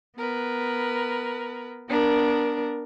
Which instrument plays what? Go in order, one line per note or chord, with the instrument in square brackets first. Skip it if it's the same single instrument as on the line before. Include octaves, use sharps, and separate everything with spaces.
[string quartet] B3 A#4 B4
B3 D4 A#4